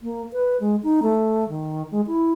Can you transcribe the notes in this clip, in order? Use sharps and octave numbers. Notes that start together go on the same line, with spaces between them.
A#3
B4
G#3
D#4
A3
D#3
G#3
E4